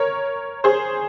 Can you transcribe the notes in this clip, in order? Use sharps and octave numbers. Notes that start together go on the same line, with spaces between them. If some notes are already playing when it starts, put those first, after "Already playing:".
Already playing: A#4 C#5
G#4 C5